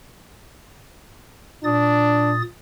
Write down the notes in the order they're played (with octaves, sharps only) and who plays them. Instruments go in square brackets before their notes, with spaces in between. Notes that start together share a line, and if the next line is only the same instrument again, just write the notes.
[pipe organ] A#2 D#6 A6 [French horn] D4